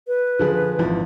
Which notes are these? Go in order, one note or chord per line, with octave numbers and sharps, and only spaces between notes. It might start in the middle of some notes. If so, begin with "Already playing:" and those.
B4
D3 F3 G#4
G#1 E3 F3